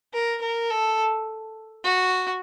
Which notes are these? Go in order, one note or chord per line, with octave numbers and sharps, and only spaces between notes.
A#4
A#4
A4
F#4